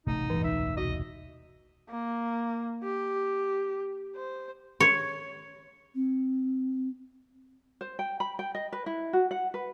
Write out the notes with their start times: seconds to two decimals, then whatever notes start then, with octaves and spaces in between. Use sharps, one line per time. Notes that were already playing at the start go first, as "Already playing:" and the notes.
0.07 E1 A1 E2 C3 A3 D#4
0.30 F#1 G2 E3 A3
0.44 C#2 D#4 E5
0.77 C2 F#4 D#5
1.90 A#3
2.83 G4
4.16 C5
4.80 C#5
5.95 C4
7.81 C5
7.99 G5
8.20 B5
8.39 G5
8.55 D#5
8.73 B4
8.86 E4
9.13 F#4
9.31 F#5
9.54 B4